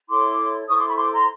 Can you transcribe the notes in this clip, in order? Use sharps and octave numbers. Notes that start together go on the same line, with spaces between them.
E4 A4 C#5 C6 D6
E4 A4 C5 C#6 D#6
C6 D6
B5 C#6
C6 D6
A#5 C6